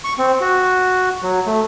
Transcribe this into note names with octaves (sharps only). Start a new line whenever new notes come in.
C#6
C4
F#4
F#3
A3